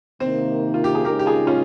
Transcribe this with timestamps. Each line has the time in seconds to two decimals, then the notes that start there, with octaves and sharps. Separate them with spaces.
0.20 C3 D#3 A#3 C4 D#4
0.74 F4
0.84 G4
0.95 G#4
1.05 C#3 G#3 D#4 G4 A#4
1.19 G4
1.26 F4 G#4
1.47 C#4 F4